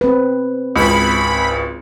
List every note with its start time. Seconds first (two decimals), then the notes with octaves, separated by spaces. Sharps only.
0.01 C4 B4
0.76 G#1 C#2 B5